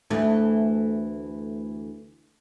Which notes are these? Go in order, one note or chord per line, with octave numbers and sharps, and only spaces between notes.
D2 E3 A3